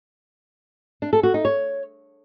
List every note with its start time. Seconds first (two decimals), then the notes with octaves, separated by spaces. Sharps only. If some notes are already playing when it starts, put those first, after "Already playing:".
1.02 D4
1.13 A4
1.23 F#4
1.34 D#4
1.45 C#5